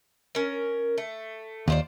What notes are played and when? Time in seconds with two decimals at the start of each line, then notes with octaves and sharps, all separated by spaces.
0.35 C#4 A#4
0.98 A3
1.68 D#2 F4 C5 D5